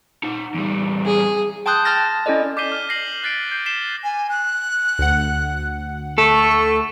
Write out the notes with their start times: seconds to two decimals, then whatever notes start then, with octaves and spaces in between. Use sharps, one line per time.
0.23 D#4 F#5
0.54 E2 G3
1.06 G#4
1.66 G5 A5 C6 D#6 F#6 G6
1.85 A5 C6 F6 A6 A#6
2.26 C#4 E4 A4 D5 D#5
2.57 D6 G6 B6 C7 D#7 G7
2.72 F6
2.89 A#6 C7 F#7
3.23 F6 F#6 A6 B6 C7 D7
3.52 G6 C7
3.66 B6 C7 E7 G7
4.03 G#5
4.29 F#6
4.99 D2 F#5
6.18 A3 A4 C#6